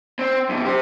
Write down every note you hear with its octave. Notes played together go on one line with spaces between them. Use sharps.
C4
F#2 B2
G4 C5